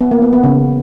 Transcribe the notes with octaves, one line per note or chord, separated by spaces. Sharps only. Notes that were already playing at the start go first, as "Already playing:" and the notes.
B3
A#3
B3
B3
C#3